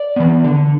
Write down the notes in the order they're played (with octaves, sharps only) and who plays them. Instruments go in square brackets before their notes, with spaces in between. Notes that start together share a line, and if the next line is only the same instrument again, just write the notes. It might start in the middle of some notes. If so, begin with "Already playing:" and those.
Already playing: [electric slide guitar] D5
E3 B3
D3